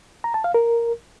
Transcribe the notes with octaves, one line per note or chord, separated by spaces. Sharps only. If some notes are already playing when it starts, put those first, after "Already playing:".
A#5
A5
F5
A#4